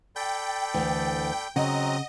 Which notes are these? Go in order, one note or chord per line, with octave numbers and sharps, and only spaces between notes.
A4 D5 G5 B5
D2 E3
C#3 F#3 C4 D#5 F#5 A#5